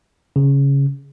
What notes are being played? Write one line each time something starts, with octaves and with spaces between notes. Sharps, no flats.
C#3